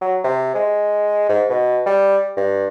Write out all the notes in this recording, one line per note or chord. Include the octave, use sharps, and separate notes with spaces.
F#3
C3
G#3
G#2
B2
G3
G2